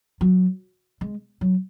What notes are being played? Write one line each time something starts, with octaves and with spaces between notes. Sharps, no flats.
F#3
G#3
F#3